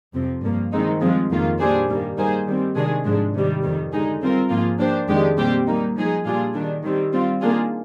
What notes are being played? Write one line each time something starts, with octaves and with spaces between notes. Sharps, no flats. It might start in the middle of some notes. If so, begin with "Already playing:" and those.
F2 C3 F3 C4
G2 F3 A#3
D#3 G#3 C4 D#4
G2 F3 G#3 C4 F4
F2 D#3 A#3 F4
A#2 G3 D4 G#4 C5
G2 D#3 G3 A#3
G3 A#3 D#4 G#4 C5
D#3 G3 C4
C3 D#3 G#3 D4 G#4
G#2 F3 G#3 D4
C3 D#3 G3
F2 D#3 G3
D3 G#3 D#4 G#4
G3 C4 F4 A#4
G#2 F3 A#3 F4 G#4
F3 A#3 D4 G4 C5
F2 D#3 G#3 D4 G4
A#2 G3 C4 G4 C5
G3 A#3 D#4
F3 G#3 D#4 G#4
A#2 G3 D4 F4 G#4
D#3 G3 D4
D#3 G3 C4
G3 C4 F4
D#3 A#3 D4 F4 G#4